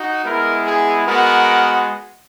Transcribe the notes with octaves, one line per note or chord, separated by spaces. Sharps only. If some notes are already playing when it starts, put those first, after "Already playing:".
Already playing: D#4 F#4
G#3 B3 E4 A#4
G#4
G#3 B3 F#4 A#4